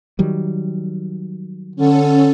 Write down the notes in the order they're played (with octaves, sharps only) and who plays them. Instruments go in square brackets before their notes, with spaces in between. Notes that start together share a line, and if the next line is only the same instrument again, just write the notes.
[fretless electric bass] D#3 F#3 G3
[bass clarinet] D3 [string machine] C#4 A4